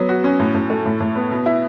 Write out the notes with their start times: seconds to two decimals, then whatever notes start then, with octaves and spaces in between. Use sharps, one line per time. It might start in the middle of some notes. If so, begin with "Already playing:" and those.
Already playing: F#3 B3
0.09 F#4
0.24 C#4
0.39 A2
0.55 A2
0.70 A3
0.85 A2
1.00 A2
1.15 B3
1.31 B2
1.46 E4